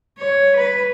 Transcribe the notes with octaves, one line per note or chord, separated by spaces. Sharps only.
C#5
B4